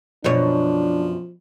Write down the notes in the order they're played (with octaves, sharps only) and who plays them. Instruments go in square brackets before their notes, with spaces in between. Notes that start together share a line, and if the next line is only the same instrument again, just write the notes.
[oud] F#2 B2 C#5 [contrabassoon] F3 [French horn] D4